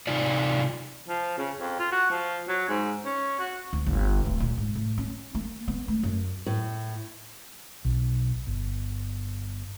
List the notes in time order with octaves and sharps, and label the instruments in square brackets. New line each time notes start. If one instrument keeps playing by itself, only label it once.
[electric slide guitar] C3 D#4 F4 D5
[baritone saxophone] F3
C#3
F2
F4
F#4
F3
F#3
G#2
C#4
F#4
[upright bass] D2
G1
D1
A#2
G#2
A2
C#4
A#3
B3
A3
F#2
[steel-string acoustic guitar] A2
[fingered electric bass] B1
G1